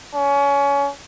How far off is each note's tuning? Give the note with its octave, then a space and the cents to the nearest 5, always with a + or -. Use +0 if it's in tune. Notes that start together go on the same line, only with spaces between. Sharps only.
C#4 +25